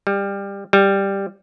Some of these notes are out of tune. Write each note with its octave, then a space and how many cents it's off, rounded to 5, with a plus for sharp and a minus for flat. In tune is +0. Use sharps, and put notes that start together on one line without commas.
G3 +20
G3 +5